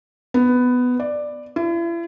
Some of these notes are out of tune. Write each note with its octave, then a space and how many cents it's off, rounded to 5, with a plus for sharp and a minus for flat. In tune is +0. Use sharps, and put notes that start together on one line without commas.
B3 +10
D5 +10
E4 +40